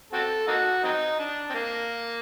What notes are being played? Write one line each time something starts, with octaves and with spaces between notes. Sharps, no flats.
C4 F#4 A4
A#3 D#4 F#4
F#3 C4 D#4
D4
C4
A#3